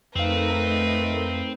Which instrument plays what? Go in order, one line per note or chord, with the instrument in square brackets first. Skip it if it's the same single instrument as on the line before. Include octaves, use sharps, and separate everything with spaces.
[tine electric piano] F2 F5 [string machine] A3 D#4 A#4 [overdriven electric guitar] C4 [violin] B4